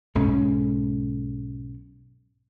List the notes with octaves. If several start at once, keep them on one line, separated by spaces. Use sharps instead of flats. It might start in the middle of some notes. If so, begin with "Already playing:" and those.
B1 G#2 G#3 C#4